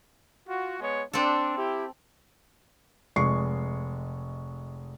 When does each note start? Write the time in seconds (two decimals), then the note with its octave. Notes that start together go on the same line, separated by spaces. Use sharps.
0.47 F4 F#4
0.80 G#3 B3 C#5
1.13 C4 D4 A4
1.57 E4 G4
3.16 F1 G#3 C#6 C7